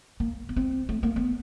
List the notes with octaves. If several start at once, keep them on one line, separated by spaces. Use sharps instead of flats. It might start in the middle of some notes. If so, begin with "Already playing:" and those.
A#3
B3
C4
A3
A#3
B3